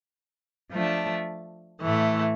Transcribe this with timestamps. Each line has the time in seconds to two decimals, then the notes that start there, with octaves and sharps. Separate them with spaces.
0.71 F3 A3 D4
1.81 A2 E3 A3